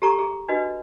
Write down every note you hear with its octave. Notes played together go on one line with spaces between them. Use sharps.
G4 A4 A#5 C#6 D6
G#4
D4 F#4 B4 D#5